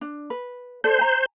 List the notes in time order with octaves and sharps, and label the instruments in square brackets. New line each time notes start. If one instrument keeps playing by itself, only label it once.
[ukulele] D4
B4
[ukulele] A4 D5 [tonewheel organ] C5
[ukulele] G#5 A#5